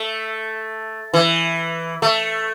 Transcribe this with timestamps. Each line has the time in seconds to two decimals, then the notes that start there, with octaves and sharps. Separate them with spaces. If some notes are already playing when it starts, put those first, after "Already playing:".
Already playing: A3
1.14 E3
2.02 A3